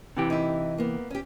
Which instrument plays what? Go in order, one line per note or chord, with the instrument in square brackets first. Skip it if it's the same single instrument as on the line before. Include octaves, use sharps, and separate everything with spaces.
[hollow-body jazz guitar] C3 E3 G4
[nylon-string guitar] D#4 E4
A#3 B3
C#4 G4